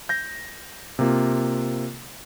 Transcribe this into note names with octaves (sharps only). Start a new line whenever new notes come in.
G6 A#6
C3 A#3 F4